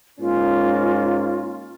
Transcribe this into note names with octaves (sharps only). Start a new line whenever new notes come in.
G#2 A#3 C#4 F4